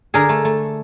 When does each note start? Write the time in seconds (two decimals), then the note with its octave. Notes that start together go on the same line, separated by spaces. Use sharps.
0.14 D3 G#4 A#4
0.29 A3
0.45 A3